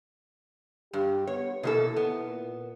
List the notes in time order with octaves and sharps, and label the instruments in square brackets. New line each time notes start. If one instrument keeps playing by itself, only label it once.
[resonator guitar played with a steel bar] G2 [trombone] G4
[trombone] B3 [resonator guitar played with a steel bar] C#5
[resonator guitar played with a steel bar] B2 A#3 A4 [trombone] E4
[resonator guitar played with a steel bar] B3
[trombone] A#2